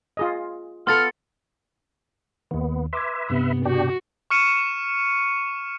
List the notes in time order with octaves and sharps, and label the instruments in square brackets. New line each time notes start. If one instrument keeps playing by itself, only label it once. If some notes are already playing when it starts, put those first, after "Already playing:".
[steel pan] F4 G#4 D#5
[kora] B3 F4 A4 [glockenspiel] C6 A6 C#7 [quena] F6
[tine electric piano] D#2 D#3 [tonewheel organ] B3
[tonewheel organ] B4 E5 [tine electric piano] C6 D6 G#6
[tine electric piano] G2 C3 [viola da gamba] B3
[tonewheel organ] B2 D4 G4 [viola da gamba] F#4
[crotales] C#6 F6 C#7 D#7 E7